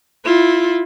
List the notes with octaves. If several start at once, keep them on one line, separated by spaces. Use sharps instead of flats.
E4 F4